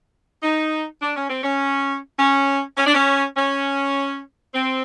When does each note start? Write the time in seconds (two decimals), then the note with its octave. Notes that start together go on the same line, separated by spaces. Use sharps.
0.43 D#4
1.02 D4
1.16 C#4
1.30 C4
1.43 C#4
2.19 C#4
2.77 C#4
2.87 D4
2.95 C#4
3.37 C#4
4.54 C4